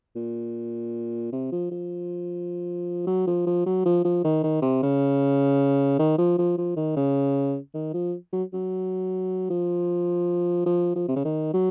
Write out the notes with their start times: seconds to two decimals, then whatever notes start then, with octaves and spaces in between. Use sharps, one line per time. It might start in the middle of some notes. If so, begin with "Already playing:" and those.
0.16 A#2
1.33 C3
1.52 F3
1.71 F3
3.07 F#3
3.27 F3
3.47 F3
3.66 F#3
3.86 F3
4.05 F3
4.24 D#3
4.43 D#3
4.62 C3
4.83 C#3
5.99 D#3
6.18 F3
6.38 F3
6.58 F3
6.76 D#3
6.97 C#3
7.74 D#3
7.94 F3
8.33 F#3
8.54 F#3
9.50 F3
10.66 F3
10.96 F3
11.09 C3
11.16 C#3
11.25 D#3
11.54 F#3